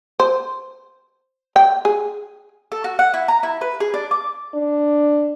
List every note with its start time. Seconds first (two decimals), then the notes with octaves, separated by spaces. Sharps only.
0.20 C5
1.56 G5
1.85 G#4
2.72 A4
2.84 F#4
2.99 F#5
3.14 E4
3.28 A#5
3.43 E4
3.61 B4
3.80 G#4
3.94 D4
4.11 D6
4.55 D4